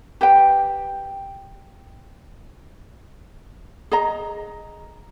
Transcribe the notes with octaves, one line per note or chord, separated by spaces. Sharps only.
G4 B4 G5
G#4 D#5 A#5